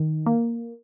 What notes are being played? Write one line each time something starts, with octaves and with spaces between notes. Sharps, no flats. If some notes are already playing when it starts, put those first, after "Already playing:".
Already playing: D#3
A#3